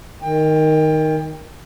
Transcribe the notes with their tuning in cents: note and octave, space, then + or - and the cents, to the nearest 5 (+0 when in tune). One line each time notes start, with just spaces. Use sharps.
D#3 +0 G5 +25